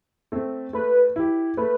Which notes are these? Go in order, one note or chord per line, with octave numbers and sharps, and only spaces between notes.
A3 C4
A3 B4
E4 G4
A3 B4